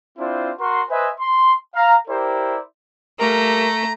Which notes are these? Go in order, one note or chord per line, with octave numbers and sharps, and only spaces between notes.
C4 D4 E4 F4 C5
F#4 A#4 C6
B4 C5 D#5 E5 G#5
C6
F5 A#5
E4 G4 A#4 C5 D5
G3 A3 A#3 A#4 A#5